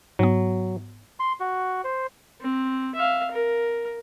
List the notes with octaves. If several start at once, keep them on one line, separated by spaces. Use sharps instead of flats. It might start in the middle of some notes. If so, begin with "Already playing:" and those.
G#2 F#3 B3
C6
F#4
C5
C4
E5 F5
A#4